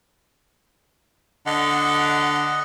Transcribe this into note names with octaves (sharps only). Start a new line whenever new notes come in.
D3 D#5 F#5